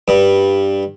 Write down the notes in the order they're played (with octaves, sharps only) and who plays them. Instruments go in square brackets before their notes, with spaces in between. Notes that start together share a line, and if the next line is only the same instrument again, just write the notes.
[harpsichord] G2